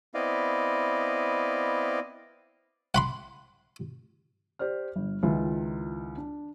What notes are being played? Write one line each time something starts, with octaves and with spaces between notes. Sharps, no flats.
B3 C4 E4 D5 D#5 F5
F#5 B5 C6
G4 C5 D5 F6
G1
C#2 D#3 E4 F4 B4 E5
D4